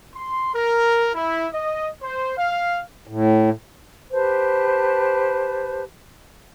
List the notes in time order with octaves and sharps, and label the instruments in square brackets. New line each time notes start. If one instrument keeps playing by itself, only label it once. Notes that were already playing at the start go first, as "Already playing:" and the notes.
[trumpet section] C6
A#4
E4
D#5
C5
F5
[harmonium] A2
[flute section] G4 B4 C5 A5